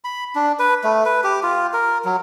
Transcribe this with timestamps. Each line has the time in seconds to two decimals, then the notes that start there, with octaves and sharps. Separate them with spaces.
0.04 B5
0.35 D4
0.59 B4
0.84 A3
1.06 B4
1.24 G4
1.43 F4
1.73 A#4
2.05 F#3